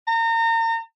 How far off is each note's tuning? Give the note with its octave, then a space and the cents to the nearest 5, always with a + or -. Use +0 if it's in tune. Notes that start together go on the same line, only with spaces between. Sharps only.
A#5 -35